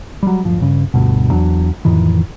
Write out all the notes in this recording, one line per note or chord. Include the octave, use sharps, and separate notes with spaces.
F#3 G3
D1 G1 F3
G2 C#3
D2 G2 B2
E2 F#3 D4
F2 A2 D#3 E3